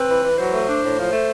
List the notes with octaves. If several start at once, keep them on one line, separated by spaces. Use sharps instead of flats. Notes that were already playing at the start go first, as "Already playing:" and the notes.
Already playing: C4 B4
E3
E3
F#3 C5
A3
D4
A2
F3
A3